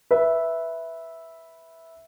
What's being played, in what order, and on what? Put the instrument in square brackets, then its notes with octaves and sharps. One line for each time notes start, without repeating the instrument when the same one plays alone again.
[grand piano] B4 E5